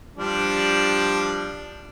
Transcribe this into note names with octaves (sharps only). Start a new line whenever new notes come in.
F3 G3 D4